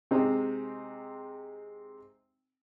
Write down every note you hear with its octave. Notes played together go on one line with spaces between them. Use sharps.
C3 G#3 C4 D#4